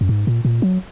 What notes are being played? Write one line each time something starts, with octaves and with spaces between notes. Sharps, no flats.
F#2
G#2
A#2
A#2
F#3